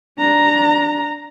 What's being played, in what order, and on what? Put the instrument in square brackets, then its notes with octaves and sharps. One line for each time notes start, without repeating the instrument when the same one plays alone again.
[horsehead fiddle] D4 A#5